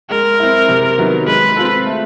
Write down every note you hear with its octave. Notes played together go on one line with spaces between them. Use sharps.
G#3 A#4
C4 E4
C3
D#3 F#3 B3
G#3 B4
C4 F4 A4
A3